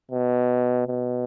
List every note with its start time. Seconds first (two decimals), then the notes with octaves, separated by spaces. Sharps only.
0.11 B2
0.88 B2